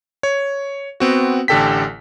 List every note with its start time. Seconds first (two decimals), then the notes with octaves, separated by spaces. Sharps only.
0.23 C#5
1.00 B3 C4 F#4
1.48 A1 D3 G4 A4 G5 B6